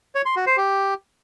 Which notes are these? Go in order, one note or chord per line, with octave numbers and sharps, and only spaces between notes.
C#5
C6
F#4
C5
G4